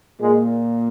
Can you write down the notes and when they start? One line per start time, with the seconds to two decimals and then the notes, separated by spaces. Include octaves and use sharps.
0.20 A#2 G#3